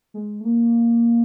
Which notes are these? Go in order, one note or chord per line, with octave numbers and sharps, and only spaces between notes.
G#3
A3
A#3